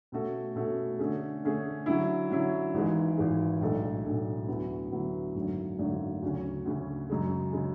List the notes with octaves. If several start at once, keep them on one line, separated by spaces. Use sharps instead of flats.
B2 A3 C#4 F#4 A4
B2 A3 C#4 F#4 A4
D3 A3 C#4 G#4
D3 A3 C#4 G#4
D3 F#3 C#4 E4
D3 F#3 C#4 E4
G#1 G#2 E3 G#3
G#1 G#2 E3 G#3
B1 A2 G#3 D4 A4
B1 A2 G#3 D4 A4
D2 D3 F#3 B3 E4
D2 D3 F#3 B3 E4
G#1 F#2 D3 A3 C#4
G#1 F#2 D3 A3 C#4
D2 C#3 F#3 C#4
D2 C#3 F#3 C#4
F#2 C#3 G#3
C#3 G#3